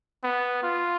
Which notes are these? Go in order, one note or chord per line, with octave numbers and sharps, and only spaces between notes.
B3
F4